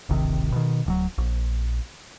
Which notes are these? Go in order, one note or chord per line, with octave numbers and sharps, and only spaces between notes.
D1 G#1 C3 D#3
B2 D#3
D1 F3 F#3
A#1